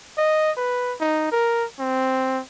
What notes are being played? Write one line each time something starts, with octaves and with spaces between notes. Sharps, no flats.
D#5
B4
D#4
A#4
C4